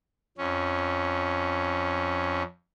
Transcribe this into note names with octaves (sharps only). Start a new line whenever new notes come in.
F2 C#4